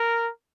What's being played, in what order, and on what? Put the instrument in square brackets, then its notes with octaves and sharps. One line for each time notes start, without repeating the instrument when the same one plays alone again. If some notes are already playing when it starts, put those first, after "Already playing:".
Already playing: [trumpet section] A#4